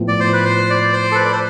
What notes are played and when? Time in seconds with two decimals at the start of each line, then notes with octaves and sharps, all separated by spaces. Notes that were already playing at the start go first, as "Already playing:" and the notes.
Already playing: A2 F3 B3
0.08 D5
0.20 C5
0.33 B4
0.45 C5
0.70 D5
0.93 C5
1.12 A4
1.15 B4
1.25 D5
1.32 C5